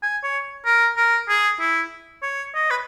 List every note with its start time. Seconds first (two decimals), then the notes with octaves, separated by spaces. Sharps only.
0.03 G#5
0.23 C#5
0.65 A#4
0.97 A#4
1.29 G#4
1.60 E4
2.22 C#5
2.55 D#5
2.71 B4